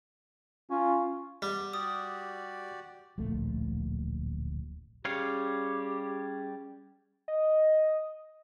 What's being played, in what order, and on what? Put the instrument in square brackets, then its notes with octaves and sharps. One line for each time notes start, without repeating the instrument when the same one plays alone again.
[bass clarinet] C#4 [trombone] F4
[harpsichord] G3 [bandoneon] B3
[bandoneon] F#4 G4 D5 [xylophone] D#6
[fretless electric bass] D1 A#1 A3
[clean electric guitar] G3 C#5 F5 [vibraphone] C#4 G#4 [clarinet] G4
[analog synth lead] D#5